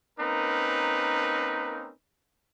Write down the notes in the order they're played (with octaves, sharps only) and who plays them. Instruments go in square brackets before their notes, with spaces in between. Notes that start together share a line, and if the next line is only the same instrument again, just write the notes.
[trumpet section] A#3 C4 C#4 D#4 A#4 B4